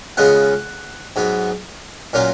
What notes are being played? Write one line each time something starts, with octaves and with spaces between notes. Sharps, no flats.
C#3 G#3 B3 F4 F#5
G#2 F#3 B3
A#2 F#3 A#3 C#4 F4